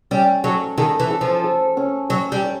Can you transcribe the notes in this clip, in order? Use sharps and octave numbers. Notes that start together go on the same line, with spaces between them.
G3 C#4
F#3 A4
D#3 A4
E3
A4
F3
A4
C#4
F#3 C#5
G3
C#5